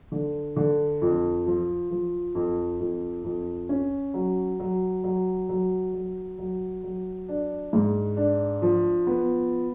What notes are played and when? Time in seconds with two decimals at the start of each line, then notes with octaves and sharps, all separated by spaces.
0.12 D3
0.56 D3
1.02 F2
1.46 F3
1.91 F3
2.35 F2
2.80 F2
3.24 F2
3.69 C#4
4.14 F#3
4.60 F#3
5.04 F#3
5.49 F#3
5.94 F#3
6.39 F#3
6.83 F#3
7.28 D4
7.73 G#2
8.17 D4
8.62 F3
9.07 B3